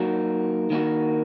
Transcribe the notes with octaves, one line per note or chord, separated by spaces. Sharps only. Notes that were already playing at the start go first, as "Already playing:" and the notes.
Already playing: F#3 A#3 D#4 F#4
D#3 A#3 D#4 F#4